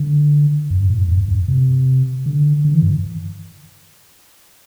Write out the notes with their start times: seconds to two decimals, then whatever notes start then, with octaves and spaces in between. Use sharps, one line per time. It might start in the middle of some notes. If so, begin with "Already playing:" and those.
Already playing: D3
0.70 F#2
0.79 G2
0.90 A2
0.98 F#2
1.08 E2
1.18 F#2
1.28 G2
1.48 C3
2.26 D3
2.65 D3
2.74 E3
2.83 G2